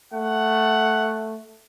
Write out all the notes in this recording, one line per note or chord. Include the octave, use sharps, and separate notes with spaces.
A3 F#5